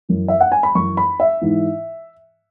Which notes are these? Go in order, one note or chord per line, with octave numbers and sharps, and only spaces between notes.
F#2 E3
E5
F#5
G#5
B5
F#2 E3 C#6
B5
E5
G#2 E3